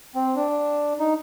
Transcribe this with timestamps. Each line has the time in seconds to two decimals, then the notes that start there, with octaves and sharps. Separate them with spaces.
0.15 C4
0.36 D4
1.00 D#4